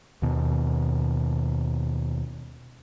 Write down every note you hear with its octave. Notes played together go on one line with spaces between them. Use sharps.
D#2 B2